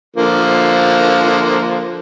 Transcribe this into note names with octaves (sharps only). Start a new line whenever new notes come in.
D3 F3 A#3